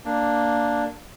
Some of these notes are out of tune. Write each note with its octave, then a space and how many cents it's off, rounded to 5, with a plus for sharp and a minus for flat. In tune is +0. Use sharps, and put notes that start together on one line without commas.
A#3 +0 D4 +0